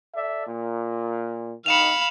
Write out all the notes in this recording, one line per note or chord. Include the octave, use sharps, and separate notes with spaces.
A4 D5 E5
A#2
D#3 F5 B5 C#7 E7 F7